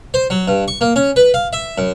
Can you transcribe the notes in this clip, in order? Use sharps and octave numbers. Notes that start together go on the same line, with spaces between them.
C5
F#3
G2
C#6
A#3
C#4
B4
F5
E5
F#2